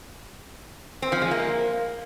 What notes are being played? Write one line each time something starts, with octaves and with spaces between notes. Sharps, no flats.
C4
F3
G#3
A#3